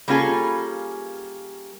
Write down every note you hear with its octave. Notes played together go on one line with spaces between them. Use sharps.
G3 A#3 C#4 F4 G#4 A4